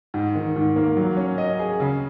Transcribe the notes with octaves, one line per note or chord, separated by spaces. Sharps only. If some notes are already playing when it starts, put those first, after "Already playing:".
G#2
D#3
G#2
A#3
F#3
C#4
D#5
G#4
C#3